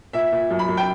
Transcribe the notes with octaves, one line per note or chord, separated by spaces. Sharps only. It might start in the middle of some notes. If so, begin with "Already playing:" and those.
A#2 E5
A#2
F#2
B5
F#2
G5